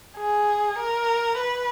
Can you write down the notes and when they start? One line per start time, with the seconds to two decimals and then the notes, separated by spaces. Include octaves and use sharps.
0.17 G#4
0.78 A#4
1.40 B4